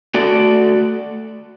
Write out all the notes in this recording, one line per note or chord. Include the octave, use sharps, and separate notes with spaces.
A3 F#4 A4 D5